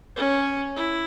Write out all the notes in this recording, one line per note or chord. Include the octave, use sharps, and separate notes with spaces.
C#4
E4